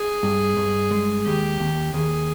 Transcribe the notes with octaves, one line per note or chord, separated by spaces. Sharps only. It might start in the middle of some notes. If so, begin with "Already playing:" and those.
Already playing: G#4
G2
G2
G#3
D#2 G4
D#2
D#2 G#4